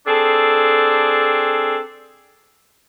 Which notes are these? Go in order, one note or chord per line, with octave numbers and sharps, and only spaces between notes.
C4 D4 G#4 A4